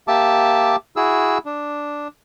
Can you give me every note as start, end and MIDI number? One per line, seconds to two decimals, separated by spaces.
0.08 0.76 58
0.08 0.76 67
0.08 0.76 76
0.08 0.76 81
0.08 0.76 86
0.96 1.38 64
0.96 1.38 66
0.96 1.38 68
0.96 1.38 88
1.46 2.08 62